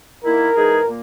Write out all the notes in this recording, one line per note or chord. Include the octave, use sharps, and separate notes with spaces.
D#3 A#3 E4 A#4
E3 G#3 D#4 G#4
A#2 A#3